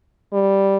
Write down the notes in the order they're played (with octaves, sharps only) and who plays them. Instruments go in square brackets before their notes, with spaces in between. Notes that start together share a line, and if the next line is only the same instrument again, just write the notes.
[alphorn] G3